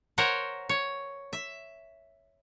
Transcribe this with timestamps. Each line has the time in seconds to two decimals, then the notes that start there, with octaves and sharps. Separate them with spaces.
0.18 A#4 C5 C#5 F#5
0.69 C#5
1.33 E5